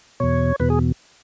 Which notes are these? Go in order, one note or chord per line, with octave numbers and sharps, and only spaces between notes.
E2 B2 C#5
E2 B2 B4
G#4